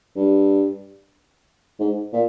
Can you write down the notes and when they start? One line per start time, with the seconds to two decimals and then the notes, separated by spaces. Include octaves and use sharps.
0.16 G2
1.80 G#2
2.13 A#2